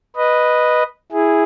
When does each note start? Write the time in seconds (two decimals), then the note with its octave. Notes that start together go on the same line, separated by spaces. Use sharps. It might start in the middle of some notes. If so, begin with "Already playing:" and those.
0.16 B4 D#5
1.12 E4 G#4